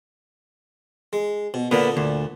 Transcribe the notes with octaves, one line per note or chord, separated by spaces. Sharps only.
G#3
B2
A#2 D3 A#3 B3 D4
D2